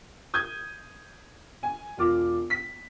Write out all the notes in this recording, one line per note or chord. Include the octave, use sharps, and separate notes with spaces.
D#6 G6 G#6
G#5
E1 F4 D6
B6